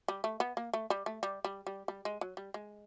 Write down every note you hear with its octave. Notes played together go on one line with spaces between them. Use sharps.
G3
A3
B3
A#3
A3
G3
A3
G3
G3
G3
G3
G#3
F#3
G3
G#3